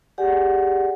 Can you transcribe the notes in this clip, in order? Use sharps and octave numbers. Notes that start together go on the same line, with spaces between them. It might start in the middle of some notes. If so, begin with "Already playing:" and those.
G4 G#4 D5 F#5 G#5